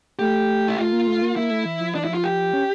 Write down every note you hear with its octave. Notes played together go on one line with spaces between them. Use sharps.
A3 G4
E4
A3 F4
A#3
A3
A#3
A#3 E4
A3
E3
F3
E3 D4
E4
F3
F4
G4
C#4